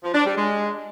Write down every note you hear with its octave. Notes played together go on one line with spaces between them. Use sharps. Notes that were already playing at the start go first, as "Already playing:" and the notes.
F3
D4
G3
G#3